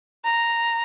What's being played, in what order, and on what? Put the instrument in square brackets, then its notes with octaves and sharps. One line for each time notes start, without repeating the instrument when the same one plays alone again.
[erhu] A#5